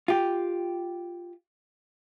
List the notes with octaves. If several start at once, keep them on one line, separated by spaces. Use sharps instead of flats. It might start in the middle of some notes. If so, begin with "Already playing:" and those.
F4 G4